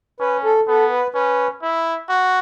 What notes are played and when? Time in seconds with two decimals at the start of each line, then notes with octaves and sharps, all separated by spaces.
0.20 C#4 B4
0.44 A4
0.67 B3 A4
0.91 B4
1.14 C#4 B4
1.62 E4
2.09 F#4